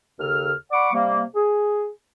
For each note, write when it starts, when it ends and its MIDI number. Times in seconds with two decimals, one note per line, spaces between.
0.19 0.52 39
0.19 0.52 49
0.19 0.52 69
0.19 0.52 89
0.71 0.89 74
0.71 0.89 78
0.71 0.89 83
0.71 0.89 85
0.71 0.89 86
0.93 1.21 48
0.93 1.21 55
0.93 1.21 58
1.35 1.89 68